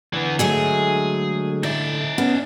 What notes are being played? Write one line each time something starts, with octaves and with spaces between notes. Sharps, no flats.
D3 E3 B3
F#3 G#3 A3 G#4
D#4 E4 D5
B3 C#4